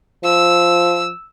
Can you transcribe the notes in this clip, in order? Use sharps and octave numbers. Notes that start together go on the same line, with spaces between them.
F3 E6